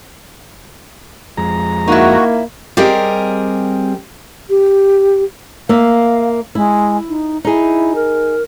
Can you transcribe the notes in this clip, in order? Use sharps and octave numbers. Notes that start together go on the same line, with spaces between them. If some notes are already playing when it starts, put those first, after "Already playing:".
F2 G#3 A#5
A#3 D#4 E4 F#4
G3 C4 G4 G#4 A#4 D#5
G4
A#3 E5 F5
G#3 E4
D#4
D#4 E4 G#4
A#4